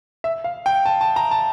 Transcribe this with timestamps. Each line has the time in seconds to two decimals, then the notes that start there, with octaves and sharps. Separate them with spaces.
0.24 E5
0.44 F5
0.66 G5
0.86 A5
1.01 A5
1.16 A#5
1.31 A5